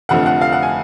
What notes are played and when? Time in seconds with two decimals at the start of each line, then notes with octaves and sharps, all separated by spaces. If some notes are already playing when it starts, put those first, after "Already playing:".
0.09 F1 F2 D3 F3 A3 F#5
0.26 F#5
0.41 F5
0.52 F#5
0.63 G#5